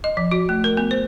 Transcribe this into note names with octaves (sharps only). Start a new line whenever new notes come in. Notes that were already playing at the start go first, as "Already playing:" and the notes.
D#5
F3
F#4
A3
A#4
B3
C5